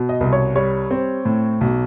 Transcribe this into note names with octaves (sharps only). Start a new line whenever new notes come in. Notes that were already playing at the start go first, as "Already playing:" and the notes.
Already playing: B2
D#5
C2
C#5
G3 C#5
C4
A2
B1